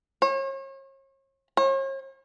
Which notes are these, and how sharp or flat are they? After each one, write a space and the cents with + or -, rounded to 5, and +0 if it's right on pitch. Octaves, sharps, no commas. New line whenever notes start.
C#5 -40
C#5 -45